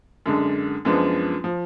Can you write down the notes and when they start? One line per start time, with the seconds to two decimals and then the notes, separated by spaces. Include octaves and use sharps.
0.26 F#2 D3 G#3 D4
0.85 F#2 F3 G#3 B3 D4
1.44 F3